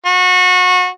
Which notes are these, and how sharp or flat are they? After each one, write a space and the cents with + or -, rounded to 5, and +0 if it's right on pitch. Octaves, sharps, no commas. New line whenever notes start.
F#4 -25